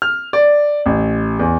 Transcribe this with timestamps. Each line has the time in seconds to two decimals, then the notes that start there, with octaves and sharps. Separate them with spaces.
0.02 F6
0.33 D5
0.86 A1
1.39 E2